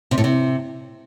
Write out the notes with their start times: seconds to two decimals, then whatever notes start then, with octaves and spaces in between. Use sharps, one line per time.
0.11 C3
0.18 A2
0.24 C3